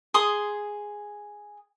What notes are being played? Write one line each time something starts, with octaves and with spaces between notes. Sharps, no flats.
G#4 C6 D#6